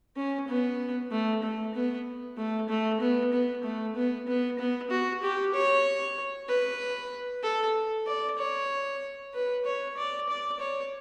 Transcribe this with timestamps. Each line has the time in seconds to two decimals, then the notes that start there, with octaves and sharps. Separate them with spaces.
0.17 C#4
0.48 B3
1.11 A3
1.43 A3
1.74 B3
2.37 A3
2.69 A3
3.01 B3
3.33 B3
3.64 A3
3.96 B3
4.28 B3
4.59 B3
4.91 F#4
5.23 G4
5.54 C#5
6.48 B4
7.43 A4
8.07 D5
8.38 C#5
9.34 B4
9.65 C#5
9.97 D5
10.29 D5
10.60 C#5